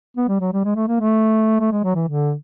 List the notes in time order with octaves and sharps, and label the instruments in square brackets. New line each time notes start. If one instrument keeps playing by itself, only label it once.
[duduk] B3
G3
F#3
G3
G#3
A3
A#3
A3
A3
G#3
F#3
E3
D3